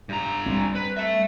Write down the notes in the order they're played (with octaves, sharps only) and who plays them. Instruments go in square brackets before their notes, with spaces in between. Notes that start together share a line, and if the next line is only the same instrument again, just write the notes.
[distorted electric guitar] G2 A#5
[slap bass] G3 A#3 C4
[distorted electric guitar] B4
E5 A5